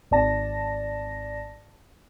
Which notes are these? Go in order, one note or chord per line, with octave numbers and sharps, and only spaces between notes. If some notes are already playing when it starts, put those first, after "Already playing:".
G#1 D5 A5 A#6